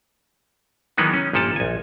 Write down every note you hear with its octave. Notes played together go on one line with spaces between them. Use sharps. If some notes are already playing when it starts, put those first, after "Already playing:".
D#3 E3 F#3 G#3 B3 D#4
C#4
G1 A#2 F3 A4 A5
A#1 G#5